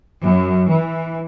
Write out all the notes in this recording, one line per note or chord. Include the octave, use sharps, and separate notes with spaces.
F#2
E3